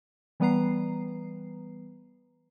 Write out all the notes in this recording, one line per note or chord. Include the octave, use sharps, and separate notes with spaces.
E3 G3 B3 B4 A#5 C7